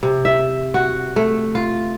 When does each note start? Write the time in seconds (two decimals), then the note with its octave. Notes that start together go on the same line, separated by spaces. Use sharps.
0.03 C3
0.25 E5
0.74 F#4
1.16 A3
1.55 F4